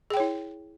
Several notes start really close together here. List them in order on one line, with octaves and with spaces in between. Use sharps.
G#4 G5 C#5 E4